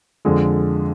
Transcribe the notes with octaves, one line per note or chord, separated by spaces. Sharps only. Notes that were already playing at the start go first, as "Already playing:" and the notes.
F2 D3 G#3